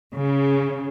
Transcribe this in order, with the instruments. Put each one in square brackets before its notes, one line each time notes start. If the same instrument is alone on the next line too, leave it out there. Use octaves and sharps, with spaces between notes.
[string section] C#3